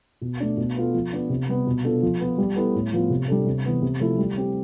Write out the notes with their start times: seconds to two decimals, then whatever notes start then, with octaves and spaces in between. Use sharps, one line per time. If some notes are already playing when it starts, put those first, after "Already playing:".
0.21 B2
0.40 A3 D4
0.58 B2
0.76 B3 F4 A4
0.94 F3
1.13 B3 D4
1.30 C3
1.49 G3 B3
1.67 B2
1.84 B3 D4 F4 A4
2.03 F3
2.20 B3 F4
2.38 G3
2.56 B3 E4 A4
2.75 A2
2.93 F3 B3 F4
3.10 C3
3.28 G3 D4 A4
3.47 C3
3.65 E3 B3
3.82 C3
4.00 F3 A3 E4 A4
4.18 G3
4.37 C4 G4